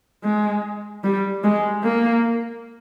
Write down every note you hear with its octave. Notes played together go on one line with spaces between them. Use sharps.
G#3
G3
G#3
A#3